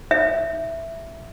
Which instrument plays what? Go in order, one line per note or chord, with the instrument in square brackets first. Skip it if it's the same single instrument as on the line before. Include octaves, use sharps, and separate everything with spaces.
[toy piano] E5